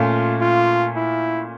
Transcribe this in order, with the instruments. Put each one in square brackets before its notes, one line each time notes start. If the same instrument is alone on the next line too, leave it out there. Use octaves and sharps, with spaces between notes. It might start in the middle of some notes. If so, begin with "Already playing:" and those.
Already playing: [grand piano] A#2 A3 C#4 [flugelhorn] F4
[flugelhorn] F4
E4